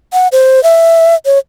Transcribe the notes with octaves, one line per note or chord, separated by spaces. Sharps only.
F#5
C5
E5
C#5